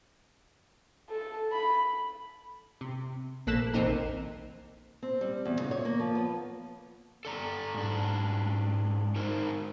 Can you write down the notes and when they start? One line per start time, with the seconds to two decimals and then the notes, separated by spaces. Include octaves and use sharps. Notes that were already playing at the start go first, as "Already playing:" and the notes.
1.10 A4
1.52 B5
2.81 C3
3.47 A#1 A#3 A4 F#6 B6 E7
3.74 A#1 E2 C3 C4 D#4 A#4
5.03 C4
5.21 G3
5.45 E2
5.60 C#3
5.71 C#5
5.85 A#3
6.00 F3
6.15 B3
7.25 A4 D5 A#5
7.75 G#2 D4
9.16 G#3 D#4 A#4 C5